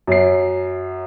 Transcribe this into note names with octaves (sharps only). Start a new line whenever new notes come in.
F#2 C7